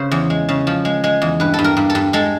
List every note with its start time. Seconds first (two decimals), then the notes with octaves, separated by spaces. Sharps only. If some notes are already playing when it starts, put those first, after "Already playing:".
Already playing: C#3 C5
0.11 E2
0.30 G#3
0.49 C#3
0.67 F3
0.85 G#3
1.04 G#3
1.22 E2
1.40 G2 B4
1.54 G2 A4
1.64 A#4
1.77 G2
1.90 A4
1.95 G2
2.13 G#3 A4